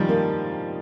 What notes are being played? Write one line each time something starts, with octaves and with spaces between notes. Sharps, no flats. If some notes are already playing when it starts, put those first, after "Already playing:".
Already playing: D#3 F3 G3 G#3
A#3